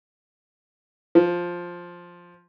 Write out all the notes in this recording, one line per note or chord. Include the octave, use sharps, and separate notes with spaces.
F3